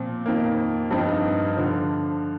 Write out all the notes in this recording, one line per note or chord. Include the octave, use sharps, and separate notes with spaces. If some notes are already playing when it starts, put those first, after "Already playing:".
Already playing: A#2 F3 C4
F2 D#3 A#3
G2 F3 C4 D#4
D3 F3